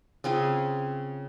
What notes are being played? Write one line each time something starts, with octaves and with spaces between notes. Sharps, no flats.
C#3 C4 F4 G#4